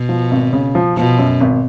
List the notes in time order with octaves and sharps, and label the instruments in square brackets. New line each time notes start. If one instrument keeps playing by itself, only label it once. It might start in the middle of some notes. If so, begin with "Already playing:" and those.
Already playing: [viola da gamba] B2
[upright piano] F3
G#1
C#3
F3
[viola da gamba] B2 [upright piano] F3
[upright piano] F#2
G#1